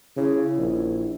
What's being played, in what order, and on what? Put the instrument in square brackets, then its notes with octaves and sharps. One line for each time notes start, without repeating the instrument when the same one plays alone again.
[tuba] C#3 [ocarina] E4
[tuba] A#1